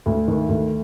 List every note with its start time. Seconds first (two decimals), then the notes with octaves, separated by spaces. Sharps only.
0.06 D2
0.28 D#3
0.49 D2